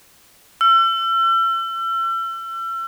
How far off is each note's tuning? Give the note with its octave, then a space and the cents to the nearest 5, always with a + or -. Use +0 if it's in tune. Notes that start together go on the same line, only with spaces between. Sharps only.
E6 +40